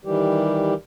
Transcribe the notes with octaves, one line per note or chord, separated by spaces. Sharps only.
D#3 E3 G3 G4